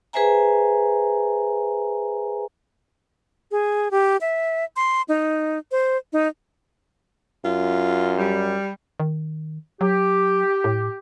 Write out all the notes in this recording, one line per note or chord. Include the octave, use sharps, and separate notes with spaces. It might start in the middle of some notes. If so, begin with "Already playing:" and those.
G#4 B4 C5 E5 G#5 A#5
G#4
G4
E5
C6
D#4
C5
D#4
F#2 F4
G3
D#3
F#3 G4
A2